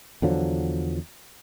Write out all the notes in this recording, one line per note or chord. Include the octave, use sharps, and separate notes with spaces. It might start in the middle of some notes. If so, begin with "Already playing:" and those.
E2 D3 F3 F#3